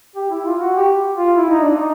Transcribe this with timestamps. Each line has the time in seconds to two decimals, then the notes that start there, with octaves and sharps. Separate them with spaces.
0.16 G4
0.31 E4
0.46 F4
0.61 F#4
0.76 G4
1.17 F4
1.37 E4
1.50 D#4
1.61 D4
1.74 D#4